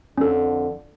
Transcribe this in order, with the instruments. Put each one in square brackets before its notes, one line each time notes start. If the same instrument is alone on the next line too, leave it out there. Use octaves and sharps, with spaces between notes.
[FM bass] F2 [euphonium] D3 [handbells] C#4 A4